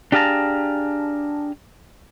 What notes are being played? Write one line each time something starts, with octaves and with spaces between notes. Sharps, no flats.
D4 G4 G#4 F5 A5 A#5